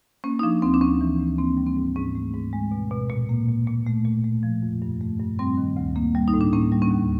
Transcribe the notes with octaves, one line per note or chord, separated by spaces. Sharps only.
A#3 C#4
D#4
F3 D4
D2 C4
D4
D2 C#4
E3
D2
A#3 C4
G3
C4
G#2
G#2 C#4
A3
G#2
G#3
B2
B2
A#2
A#3
A#2
A#2
A3
A#2
A3
F3
F2
G2
A3
G2
G3 C4
D#3
D2
A#3
G3
D#4
A2
D4
A#3 C#4
G3
C#4
D#2